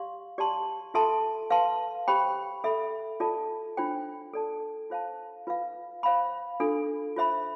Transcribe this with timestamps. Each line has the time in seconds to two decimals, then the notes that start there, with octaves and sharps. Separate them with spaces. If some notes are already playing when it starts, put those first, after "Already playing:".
Already playing: G4 D5 F5 C6
0.38 G4 D5 A5 C6
0.94 F4 A4 E5 A5 C6
1.50 B4 F5 A5 C6
2.08 G4 C5 G5 B5
2.64 A4 E5 B5
3.20 F4 A4 D5 A5
3.77 D4 F4 C5 G5
4.33 A4 D5 A5
4.90 F4 C5 F5 A5
5.47 F4 B4 F5
6.03 C5 F5 B5
6.60 D4 F4 A4
7.16 F4 C5 E5 B5